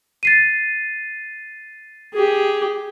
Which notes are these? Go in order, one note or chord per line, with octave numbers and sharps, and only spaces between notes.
A6 C7 D#7
G4 G#4